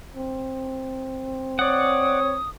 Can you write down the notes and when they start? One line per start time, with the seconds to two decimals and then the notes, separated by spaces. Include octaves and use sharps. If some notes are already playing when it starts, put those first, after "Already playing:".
0.16 C4
1.59 C#5 D5 F#5 D#6